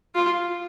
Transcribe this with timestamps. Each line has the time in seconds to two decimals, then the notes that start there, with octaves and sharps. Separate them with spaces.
0.15 F4